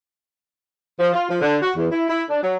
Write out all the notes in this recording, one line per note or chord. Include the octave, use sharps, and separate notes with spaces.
F3
F4
F3
D3
F#4
E2
E4
E4
D4
F#3